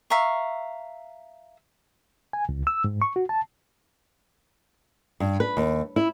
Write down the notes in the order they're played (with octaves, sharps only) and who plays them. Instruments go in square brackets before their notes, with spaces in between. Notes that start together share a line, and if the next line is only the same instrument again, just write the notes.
[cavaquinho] E5 F5 A#5 C#6
[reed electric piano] G#5
C#2
E6
G#2
C#6
F#4
A5
[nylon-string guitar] G2
B4
D#2
E4